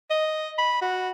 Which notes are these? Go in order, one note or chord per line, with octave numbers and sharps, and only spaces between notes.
D#5
B5
F#4